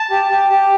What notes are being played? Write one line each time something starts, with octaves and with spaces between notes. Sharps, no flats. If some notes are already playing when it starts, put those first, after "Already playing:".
Already playing: A5
G4
G4
G4